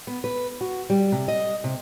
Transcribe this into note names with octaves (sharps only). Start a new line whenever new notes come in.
B3
B4
F#4
G3
C3
D#5
C3